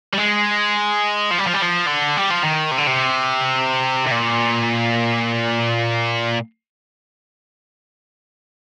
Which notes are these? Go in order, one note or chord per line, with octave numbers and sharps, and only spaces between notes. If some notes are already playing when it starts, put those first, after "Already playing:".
G3
G#3
F3
G3
F3
G3
F3
D3
G3
F3
D#3
C3
D3
C3
C3
A#2